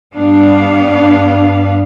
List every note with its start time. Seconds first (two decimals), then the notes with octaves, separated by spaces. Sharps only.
0.13 G2 G3 B3 D4 F5